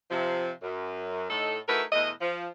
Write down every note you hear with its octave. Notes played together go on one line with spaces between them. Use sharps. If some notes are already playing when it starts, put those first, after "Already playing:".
C3 F3
F#2
A2 D#4 A4
A3 D#4 E4 F#4 A#4 B4
E2 B2 A3 D#5
F3